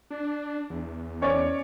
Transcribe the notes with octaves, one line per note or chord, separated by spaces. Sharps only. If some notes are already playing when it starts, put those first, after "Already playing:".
D4
E2
C#4 C#5 D5